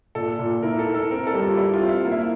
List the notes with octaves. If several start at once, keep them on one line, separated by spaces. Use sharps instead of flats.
A#2 A4
A#2
E4 A#4
A4
E4
A4
C4 A#4
A4
G3
F4
G3 E4
F4
C4
E4
A#3
E4